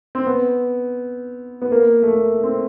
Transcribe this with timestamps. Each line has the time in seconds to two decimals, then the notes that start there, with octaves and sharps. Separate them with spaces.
0.15 C4
0.26 B3
1.62 B3
1.72 A#3
2.03 A3
2.07 A#3
2.44 C4